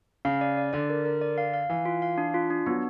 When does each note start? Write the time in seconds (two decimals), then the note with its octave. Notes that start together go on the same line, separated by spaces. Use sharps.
0.25 C#3 F5
0.41 D5
0.57 D5
0.73 D3 D5
0.90 A#4
1.05 A#4
1.22 D5
1.38 F5
1.54 F5
1.70 E3 F5
1.86 F4
2.02 F5
2.18 D4
2.34 F4
2.50 D4
2.66 F#3 B3